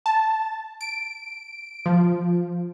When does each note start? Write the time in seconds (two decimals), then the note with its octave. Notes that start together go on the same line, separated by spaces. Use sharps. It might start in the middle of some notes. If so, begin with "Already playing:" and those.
0.06 A5
0.81 D7
1.86 F3